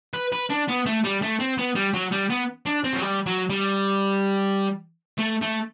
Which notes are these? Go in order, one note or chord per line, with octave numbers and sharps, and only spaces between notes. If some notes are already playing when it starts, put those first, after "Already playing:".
B4
B4
D4
B3
A3
G3
A3
C4
B3
G3
F#3
G3
B3
D4
C4
F#3
G3
F#3
G3
A3
A3